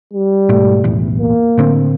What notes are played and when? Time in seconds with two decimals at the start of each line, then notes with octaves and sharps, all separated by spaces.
0.13 G3
0.49 G#2 B2 A3
0.84 B1 E2 A2
1.18 A#3
1.58 A2 D3 C4